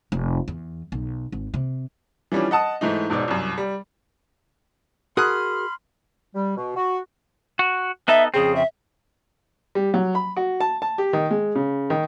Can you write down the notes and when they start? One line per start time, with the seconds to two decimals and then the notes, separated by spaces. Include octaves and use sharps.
0.12 F1
0.48 E2
0.92 B1
1.32 G#1
1.54 C3
2.32 E3 F3 G3 C#4 D4
2.51 D#5 F#5 A5 D#6
2.81 G#2 E3 A3 D#4
3.10 E1 G#2 B2 D5
3.28 C2 F#2
3.58 G3
5.17 F#4 G#4 A#4 B5 C6 D#6 F6 F#6
6.35 G3
6.57 B2
6.76 F#4
7.59 F#4
8.08 B3 D#4 A4 E5
8.34 F2 C#3 C4 G#4
8.56 E5
9.75 G3
9.94 F#3
10.15 B5
10.36 F#4
10.60 A5
10.82 A5
10.98 G4
11.13 D#3
11.30 G#3
11.55 C#3
11.90 D#3